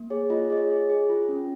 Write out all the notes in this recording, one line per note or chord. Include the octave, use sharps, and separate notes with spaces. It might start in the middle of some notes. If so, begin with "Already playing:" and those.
Already playing: A#3
G#4 C#5
F4 D#5
G#4 D#5
C#5
G#4
G#4
F4
C#4